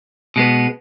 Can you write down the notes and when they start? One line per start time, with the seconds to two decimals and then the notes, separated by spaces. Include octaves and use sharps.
0.36 B2 G#3 B3